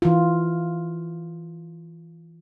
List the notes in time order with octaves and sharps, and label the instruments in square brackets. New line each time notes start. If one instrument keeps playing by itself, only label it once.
[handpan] E3 F4